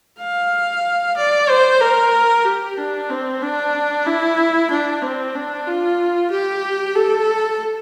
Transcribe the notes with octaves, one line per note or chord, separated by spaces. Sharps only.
F5
D5
C5
A#4
G4
D4
C4
D4
E4
D4
C4
D4
F4
G4
A4